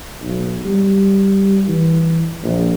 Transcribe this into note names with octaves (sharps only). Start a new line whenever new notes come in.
B1
G3
E3
A#1